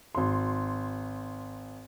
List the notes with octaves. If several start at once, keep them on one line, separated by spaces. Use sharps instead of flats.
G#1 C6